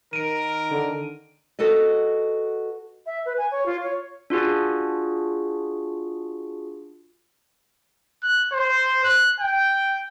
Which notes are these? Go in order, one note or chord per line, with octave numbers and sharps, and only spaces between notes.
D#3 A#4 D7 D#7
D3
F#4 A4 B4 D#5
E5
B4
G#5
C#5
F4
C#5
D4 F4 F#4 G#4
F#6
C5
F#6
G5